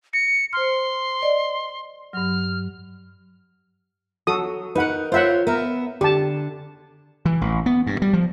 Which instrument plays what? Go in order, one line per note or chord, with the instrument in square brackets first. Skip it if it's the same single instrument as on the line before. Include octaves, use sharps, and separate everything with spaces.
[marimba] A#6 [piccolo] C#7
[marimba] C5 F6 [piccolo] C6
[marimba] D5 D#5
[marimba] G2 F#3 [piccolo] F6
[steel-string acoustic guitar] F#3 [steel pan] F#4 A4 D#6
[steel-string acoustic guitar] D#4 A#4 [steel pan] B4 F#5
[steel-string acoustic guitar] F4 A#4 C#5 [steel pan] C5 E5 F#5
[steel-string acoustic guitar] B3 E5 [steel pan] A#4
[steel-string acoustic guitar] D3 [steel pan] G4 A5
[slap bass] E3
A1
B3
G2
G3
F3